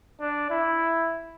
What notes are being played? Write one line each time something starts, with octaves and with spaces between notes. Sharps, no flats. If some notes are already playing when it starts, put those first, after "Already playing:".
D4
E4